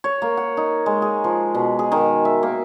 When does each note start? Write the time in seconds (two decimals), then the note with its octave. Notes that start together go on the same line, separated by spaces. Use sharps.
0.04 C#5
0.22 A#3
0.37 F#5
0.57 D#4
0.86 G#3
1.02 G#4
1.24 F3
1.55 B2
1.79 G#4
1.92 D#3
2.25 E5
2.43 A#3